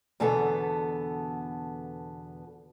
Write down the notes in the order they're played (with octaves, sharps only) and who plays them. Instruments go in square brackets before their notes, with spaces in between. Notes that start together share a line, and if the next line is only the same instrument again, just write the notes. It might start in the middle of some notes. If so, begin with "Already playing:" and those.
[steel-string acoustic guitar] E2 B2 D3 B3 A4